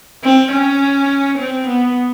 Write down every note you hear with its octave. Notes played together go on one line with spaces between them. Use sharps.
C4
C#4
C4
B3